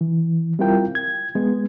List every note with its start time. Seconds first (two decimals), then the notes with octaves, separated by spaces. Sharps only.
0.01 E3
0.59 G3 C4 E4 F4 A#4 G5
0.95 G#6
1.35 G#3 B3